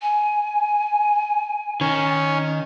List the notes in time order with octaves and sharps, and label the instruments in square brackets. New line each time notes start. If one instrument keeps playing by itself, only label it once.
[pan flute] G#5
[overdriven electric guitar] D#3 [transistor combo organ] C#4